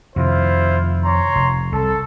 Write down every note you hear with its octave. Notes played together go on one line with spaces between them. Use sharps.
F2 C3 D#3 E4 F4 C5
C#5 A#5 C6
F1
C2 A4